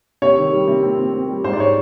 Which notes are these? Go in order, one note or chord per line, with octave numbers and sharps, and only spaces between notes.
C3 C#5
D#3
G3
C3
C4
C4
C4
G3
G#2 C5
D5
C#5